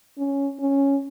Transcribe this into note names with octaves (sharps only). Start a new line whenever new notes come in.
C#4
C#4